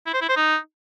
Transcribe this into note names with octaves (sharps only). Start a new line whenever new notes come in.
E4
C5
E4
C5
D#4